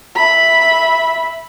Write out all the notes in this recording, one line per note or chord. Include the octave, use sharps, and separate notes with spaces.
E5 B5